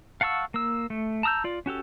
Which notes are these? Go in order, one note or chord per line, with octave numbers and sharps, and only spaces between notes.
F5 F#5 A5 C#6 E6
A#3 E6
A3
A5 A#5 D#6 E6 G6
F4 D5
C#4 F#4 G4 A4